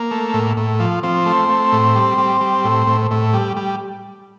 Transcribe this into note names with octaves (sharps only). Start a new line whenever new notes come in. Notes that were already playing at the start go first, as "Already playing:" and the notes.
Already playing: A#3
A3
A2
A2
F3
F3 C4
A3
A3
A2
G3
G3
G3
A2
A2
A2
G3
G3